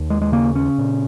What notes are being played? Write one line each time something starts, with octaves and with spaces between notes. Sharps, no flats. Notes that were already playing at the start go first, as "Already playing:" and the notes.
Already playing: D#2
G#3
G#3
C#3 A#3
C#4
A#2